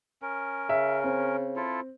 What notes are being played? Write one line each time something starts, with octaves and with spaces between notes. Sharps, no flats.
C#4 A#4
C#3 E5
C4
E4 F4 A4